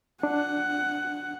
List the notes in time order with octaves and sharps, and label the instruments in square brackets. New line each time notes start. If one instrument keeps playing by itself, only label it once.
[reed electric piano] D4 [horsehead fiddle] F#5